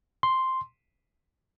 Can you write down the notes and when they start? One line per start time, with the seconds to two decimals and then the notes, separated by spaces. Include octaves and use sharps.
0.23 C6